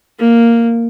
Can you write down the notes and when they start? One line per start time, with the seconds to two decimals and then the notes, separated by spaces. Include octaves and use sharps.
0.19 A#3